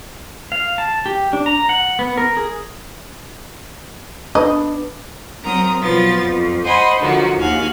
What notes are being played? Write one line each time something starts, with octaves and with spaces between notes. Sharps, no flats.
F5
A5
G4
D4
A#5
F#5
B3
A#4
G#4
D4 B4 D#5
F#3 C4 A#4 A#5 D#6
B2 F3 F#3 B3 A6
F2
C5 D#5 F#5 G#5 B5 C6
D3 D#3 F3 F#3 F#4
D#2 F#4 F5 G#5 F#6